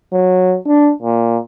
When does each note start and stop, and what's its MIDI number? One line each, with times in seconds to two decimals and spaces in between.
0.13 0.56 54
0.67 0.91 62
1.02 1.38 46